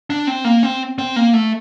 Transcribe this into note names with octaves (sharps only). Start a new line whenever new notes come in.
D4
C4
A#3
C4
C4
A#3
A3